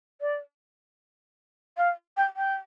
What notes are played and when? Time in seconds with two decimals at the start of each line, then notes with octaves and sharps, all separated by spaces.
0.21 D5
1.77 F5
2.17 G5
2.36 G5